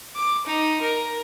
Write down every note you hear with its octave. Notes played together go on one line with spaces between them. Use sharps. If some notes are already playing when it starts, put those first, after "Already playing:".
D6
D#4
A#4